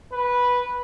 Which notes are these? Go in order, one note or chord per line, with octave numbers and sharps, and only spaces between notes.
B4